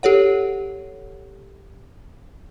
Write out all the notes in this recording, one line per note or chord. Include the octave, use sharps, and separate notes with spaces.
G4 A4 C#5 F#5